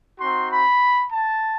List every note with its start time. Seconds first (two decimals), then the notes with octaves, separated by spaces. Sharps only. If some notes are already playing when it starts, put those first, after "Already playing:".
0.20 C4 D#4 F#4 C6
0.52 B5
1.12 A5